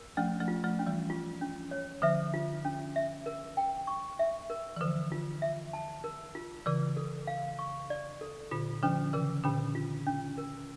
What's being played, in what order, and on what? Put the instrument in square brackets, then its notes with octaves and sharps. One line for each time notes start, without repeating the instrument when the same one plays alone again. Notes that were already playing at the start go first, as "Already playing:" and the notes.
Already playing: [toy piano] A#4
[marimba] F3 A3 [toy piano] C#4
[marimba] F3 A3
[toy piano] F4
[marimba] F3 A3
[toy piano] C#4
[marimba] E3 G3
[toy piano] F4
C#4
C#5
[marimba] D3 F3 [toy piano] E5
[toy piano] F4
C#4
E5
A#4
G5
C#6
E5
A#4
[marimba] E3
[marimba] D3 F3 [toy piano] A#4
[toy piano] F4
E5
A5
A#4
F4
[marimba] C#3 E3 [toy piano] D5
[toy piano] A4
F5
C#6
D5
A4
[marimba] A#2 D3 [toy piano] F4
[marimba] D3 F3 [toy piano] C#4
[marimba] C#3 E3 [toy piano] A#4
[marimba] A#2 D3 [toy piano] C#4
[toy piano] F4
C#4
A#4